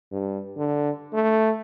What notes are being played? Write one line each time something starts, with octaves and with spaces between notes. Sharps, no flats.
G2
D3
A3